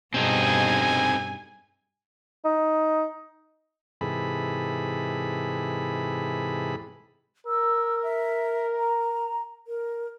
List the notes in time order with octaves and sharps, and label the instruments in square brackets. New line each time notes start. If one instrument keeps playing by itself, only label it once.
[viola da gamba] G2 B2 G#4 [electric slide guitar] C4 D#4 A4 [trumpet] G#5
[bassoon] D#4
[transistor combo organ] G#2 C3 E3 G#4 A4 B5
[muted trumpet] A#4 [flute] E6
[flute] E5
A#5
A#4